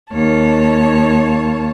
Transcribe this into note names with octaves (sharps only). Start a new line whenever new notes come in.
D#2 C#5 A5